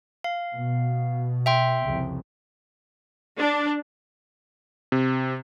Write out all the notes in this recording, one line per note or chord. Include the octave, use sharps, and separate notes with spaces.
F5
B2
E5 G5 C6
C2 F2 C#3
D4
C3